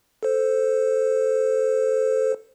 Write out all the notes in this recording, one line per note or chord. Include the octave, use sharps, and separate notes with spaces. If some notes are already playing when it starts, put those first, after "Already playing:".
A4 C5